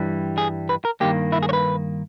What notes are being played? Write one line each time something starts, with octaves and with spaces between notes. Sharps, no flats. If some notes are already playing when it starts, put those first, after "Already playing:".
Already playing: G2 E3 G3
G#4
B4
A#4
G2 D#3 A#3 G4
E4
G#4
C#5
B4